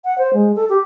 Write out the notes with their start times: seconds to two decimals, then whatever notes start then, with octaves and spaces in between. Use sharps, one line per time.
0.05 F#5
0.18 C5
0.34 G#3
0.56 A4
0.69 G4